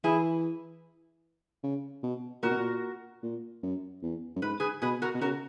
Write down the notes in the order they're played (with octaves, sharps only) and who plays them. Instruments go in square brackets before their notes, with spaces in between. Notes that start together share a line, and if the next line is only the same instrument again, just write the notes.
[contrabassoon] E3 [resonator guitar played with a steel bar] E4 G#4
[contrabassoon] C#3
B2
[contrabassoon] A#2 [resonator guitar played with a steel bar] F#4 A#4
[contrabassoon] B2
A#2
A#2
F#2
E2
F#2
[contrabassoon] G#2 [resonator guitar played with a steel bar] B4
[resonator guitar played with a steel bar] G#4 B4
[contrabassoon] B2 [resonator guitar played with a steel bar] G#4 B4
[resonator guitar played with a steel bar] F#4 A#4
[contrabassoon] B2
[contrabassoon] C#3 [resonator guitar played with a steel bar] F#4 A#4